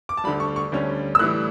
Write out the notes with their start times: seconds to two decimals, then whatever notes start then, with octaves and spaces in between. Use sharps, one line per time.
0.09 D6
0.17 A5
0.24 D2 D3 G3 B5
0.40 C#6
0.56 C#6
0.72 D2 D3 G3 C#4
1.15 E6
1.19 A2 E3 G3 D4 F#6